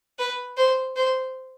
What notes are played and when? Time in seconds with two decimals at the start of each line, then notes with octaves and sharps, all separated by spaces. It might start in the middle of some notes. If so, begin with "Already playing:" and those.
0.19 B4
0.57 C5
0.96 C5